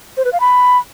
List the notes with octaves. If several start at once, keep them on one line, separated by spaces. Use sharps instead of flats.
C5
B4
F5
B5